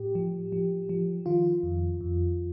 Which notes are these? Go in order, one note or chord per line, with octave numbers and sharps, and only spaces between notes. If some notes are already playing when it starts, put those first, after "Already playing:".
Already playing: A2 G4
F3
F3
F3
D#3 F4
F2
F2